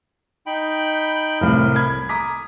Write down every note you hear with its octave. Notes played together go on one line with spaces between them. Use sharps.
D#4 G5 B5
C2 A2 A#4
B5 G#6
A#5 D6 D#6 B6